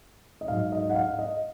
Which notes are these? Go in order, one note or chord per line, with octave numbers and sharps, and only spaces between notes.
D#5
G#2 F#3 F5
D#5
F#5
F5
D#5